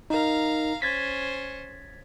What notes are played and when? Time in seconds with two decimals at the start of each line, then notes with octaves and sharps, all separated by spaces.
0.10 D#4 A#4 F5 A#5
0.82 C#4 C5 G#6 A6 B6